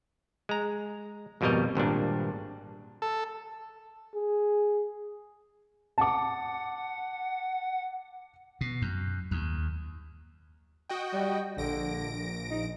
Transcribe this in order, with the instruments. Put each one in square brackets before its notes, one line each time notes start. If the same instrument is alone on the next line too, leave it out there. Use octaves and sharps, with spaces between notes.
[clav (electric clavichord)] G#3 A#5
G#1 F2 B2 G3 A#4 D#5
G#1 G2 A#2 D4
[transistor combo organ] A4
[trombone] G#4
[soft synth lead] F#5 [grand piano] A5 D6
[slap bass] B2
F#2
D#2
[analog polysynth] F#4 D#5 G5
[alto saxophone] G3
[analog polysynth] A#1 A#6 D7 [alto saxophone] D3
[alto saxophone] D#4